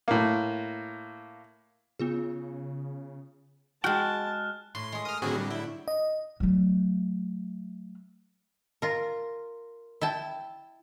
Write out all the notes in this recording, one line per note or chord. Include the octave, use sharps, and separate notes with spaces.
A2 A#3
C#3 B3 F4 G#4
G#3 F#4 G5 A5 F6 F#6
A2 C6
G#3 G#4
A#4 D#6 F6
A2 D3 F#3 C4 F#4 G#4
G3
E4 G5
D#5
F#3 A3
F4 A#4
E4 G5 A5